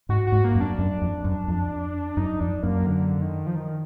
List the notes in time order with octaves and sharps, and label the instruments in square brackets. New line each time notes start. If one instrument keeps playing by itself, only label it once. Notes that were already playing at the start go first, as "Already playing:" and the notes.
[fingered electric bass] G#2 [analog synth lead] F#4
[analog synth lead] F#4
[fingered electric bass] G#2
[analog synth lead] A#3
[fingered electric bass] F#2
[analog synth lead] D4
[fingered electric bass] F#2
F2
F#2
F2
[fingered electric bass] F#2 [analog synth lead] D#4
[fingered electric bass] F2 [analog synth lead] D4
[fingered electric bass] F#2 [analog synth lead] A#3
[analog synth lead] D3
D#3
F3
D#3